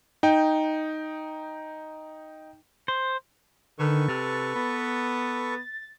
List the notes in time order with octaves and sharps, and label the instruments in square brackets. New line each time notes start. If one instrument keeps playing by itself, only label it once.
[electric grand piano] D#4 G5
[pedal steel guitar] C5
[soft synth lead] D3 [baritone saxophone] D#3 [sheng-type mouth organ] A4 B4 C#6
[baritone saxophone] C3 [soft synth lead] A6
[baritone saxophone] B3